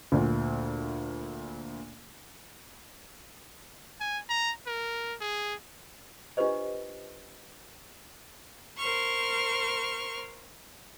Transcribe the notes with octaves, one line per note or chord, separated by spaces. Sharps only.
D2 A#2
G#5
A#5
A#4
G#4
D4 F4 G4 B4 C5 D#5
A#4 C5 C6 C#6 F6